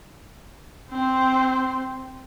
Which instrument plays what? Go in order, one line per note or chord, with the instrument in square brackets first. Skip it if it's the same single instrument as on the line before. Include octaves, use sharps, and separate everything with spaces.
[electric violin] C4 C5